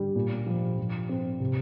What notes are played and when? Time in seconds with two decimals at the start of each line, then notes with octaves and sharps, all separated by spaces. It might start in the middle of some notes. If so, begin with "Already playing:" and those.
Already playing: D3 G3
0.15 A#2
0.46 F3
0.78 F3
1.09 C4
1.40 C3